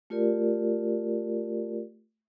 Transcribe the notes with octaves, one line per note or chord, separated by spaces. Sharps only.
A3 F4 G4 A#4 D5